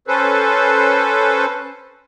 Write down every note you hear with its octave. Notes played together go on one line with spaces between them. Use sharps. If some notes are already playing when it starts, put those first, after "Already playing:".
C#4 A4 B4 C5